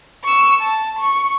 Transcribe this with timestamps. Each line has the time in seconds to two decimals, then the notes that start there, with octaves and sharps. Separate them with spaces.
0.24 C#6 E6
0.59 A5
0.99 C#6